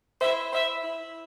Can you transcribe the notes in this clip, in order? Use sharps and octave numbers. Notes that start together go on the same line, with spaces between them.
E4 C5 E5
E4 C5 E5
E4